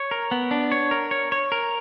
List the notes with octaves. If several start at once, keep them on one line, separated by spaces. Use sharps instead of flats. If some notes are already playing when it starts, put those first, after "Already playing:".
Already playing: C#5
A#4
B3
D4
C#5
A#4
C#5
C#5
A#4